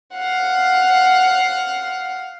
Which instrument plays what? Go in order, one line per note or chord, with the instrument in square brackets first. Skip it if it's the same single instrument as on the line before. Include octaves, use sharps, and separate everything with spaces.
[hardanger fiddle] F5 F#5